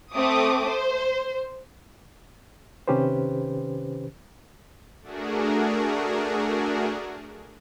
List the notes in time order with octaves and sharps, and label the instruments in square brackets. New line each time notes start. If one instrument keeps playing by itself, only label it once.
[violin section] A3 C4 D6 D#6
C5
[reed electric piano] C3 D#3 C#4 G4 B4 C5
[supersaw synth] A3 D4 F#4 G#4 A#4